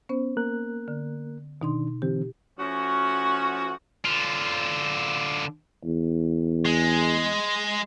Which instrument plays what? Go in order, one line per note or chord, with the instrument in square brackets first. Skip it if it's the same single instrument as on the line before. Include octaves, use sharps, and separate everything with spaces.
[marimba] B3 C#4 C5
[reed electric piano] A#3 A#4 F#6
[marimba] D3
[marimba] B2 D#4 C6 [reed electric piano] D#3 D4
[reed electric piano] D3 E3 C4 [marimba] G4
[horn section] F3 A3 C#4 F#4
[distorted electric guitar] D3 F4
[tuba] E2
[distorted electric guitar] G#3